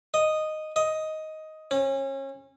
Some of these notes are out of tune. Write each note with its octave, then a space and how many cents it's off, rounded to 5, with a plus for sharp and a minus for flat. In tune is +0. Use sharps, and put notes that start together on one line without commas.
D#5 -5
D#5 +10
C#4 -30